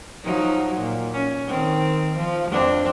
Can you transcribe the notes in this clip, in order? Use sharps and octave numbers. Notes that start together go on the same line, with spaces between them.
F3 F#3 D#4
A#2
C#4
D#3 C4
F3
F2 C4 D4